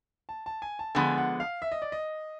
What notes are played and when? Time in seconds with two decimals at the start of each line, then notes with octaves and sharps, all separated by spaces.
0.29 A5
0.46 A5
0.62 G#5
0.79 A5
0.95 D3 F3 G#3 B3 G#5
1.17 F#5
1.40 F5
1.62 E5
1.72 D#5
1.82 D5
1.92 D#5